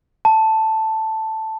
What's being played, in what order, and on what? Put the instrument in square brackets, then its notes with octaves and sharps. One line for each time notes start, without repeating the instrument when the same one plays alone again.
[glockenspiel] A5